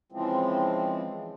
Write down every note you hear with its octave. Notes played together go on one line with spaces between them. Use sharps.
C#3 E3 F3 G#3 C4